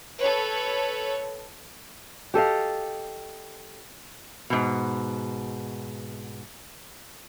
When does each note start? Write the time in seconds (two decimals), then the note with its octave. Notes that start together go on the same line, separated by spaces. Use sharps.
0.18 A4 B4 C#5
2.34 G4 A4 D#5 F5
4.50 G#2 B2